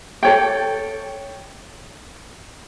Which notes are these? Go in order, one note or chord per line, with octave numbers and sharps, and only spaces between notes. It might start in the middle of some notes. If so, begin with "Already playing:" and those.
A4 C#5 G5